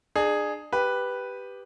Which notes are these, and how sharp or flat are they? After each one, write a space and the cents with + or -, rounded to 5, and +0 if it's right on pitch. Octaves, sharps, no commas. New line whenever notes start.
D4 +40 G#4 +0
G4 +0 B4 +0